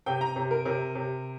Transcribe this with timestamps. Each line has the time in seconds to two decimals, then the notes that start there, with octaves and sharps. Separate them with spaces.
0.06 C3 G5
0.21 A#5
0.36 C3
0.51 A#4
0.65 C3 A#4
0.95 C3